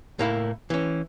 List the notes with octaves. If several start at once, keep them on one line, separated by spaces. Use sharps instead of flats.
A2 A#3 E4
E3 C#4